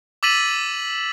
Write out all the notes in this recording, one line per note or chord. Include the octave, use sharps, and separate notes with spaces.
D6 E6 A6 B6 D#7 F#7